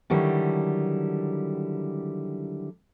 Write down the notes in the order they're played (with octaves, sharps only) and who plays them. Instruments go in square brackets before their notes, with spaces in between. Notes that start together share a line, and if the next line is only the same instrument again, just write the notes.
[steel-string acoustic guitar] D3 D#3 F#3 G3 E4